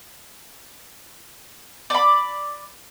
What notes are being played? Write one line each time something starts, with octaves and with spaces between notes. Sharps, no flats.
D5 B5